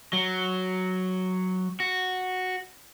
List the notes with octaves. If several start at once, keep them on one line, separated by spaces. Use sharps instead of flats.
F#3
F#4